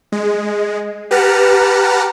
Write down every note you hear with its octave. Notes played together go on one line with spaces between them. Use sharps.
G#3
G4 B4 F#5 A5 A#5 F6